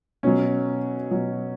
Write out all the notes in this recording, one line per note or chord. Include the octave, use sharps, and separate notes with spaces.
B2 F#3 C#4
B2 F#3